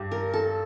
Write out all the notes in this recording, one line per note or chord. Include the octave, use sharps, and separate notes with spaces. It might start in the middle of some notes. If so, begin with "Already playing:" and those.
Already playing: G2 G4
A#4
A4